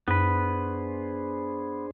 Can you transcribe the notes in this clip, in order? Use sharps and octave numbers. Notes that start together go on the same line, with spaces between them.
F#2 B3 D4 G#4 B4 C5